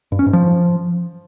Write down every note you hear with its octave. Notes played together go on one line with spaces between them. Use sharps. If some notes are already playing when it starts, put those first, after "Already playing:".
G2
C#4
G#2
F3